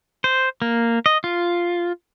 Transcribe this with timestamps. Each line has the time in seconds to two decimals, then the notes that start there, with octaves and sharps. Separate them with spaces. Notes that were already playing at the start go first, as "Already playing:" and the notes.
0.24 C5
0.62 A#3
1.06 D#5
1.24 F4